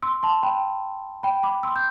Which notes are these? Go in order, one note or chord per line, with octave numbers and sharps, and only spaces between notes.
C6 E6
A5 C6
G5 B5
G5 B5
B5 D6
C6 E6
G6